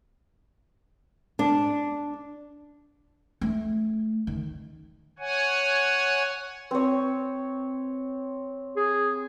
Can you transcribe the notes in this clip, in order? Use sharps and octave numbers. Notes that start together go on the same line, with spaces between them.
D4
A3
D#3
C#5 F#5 G#5
C4 C#5
G#4